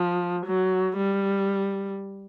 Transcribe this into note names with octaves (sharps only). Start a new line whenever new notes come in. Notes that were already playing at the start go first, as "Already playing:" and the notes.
Already playing: F3
F#3
G3